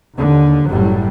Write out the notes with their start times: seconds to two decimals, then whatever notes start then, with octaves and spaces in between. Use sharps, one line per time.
0.16 D#2 D3
0.67 F#1 F#2 A2 F#3 G3